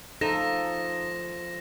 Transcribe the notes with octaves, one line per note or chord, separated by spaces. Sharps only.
F3 D#4 A4 A#6 E7